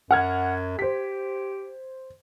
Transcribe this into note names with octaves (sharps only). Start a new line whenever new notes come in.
F#2 F#5 F6 G#6
G4 C5 B6